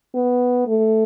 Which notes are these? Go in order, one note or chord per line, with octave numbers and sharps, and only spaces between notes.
B3
A3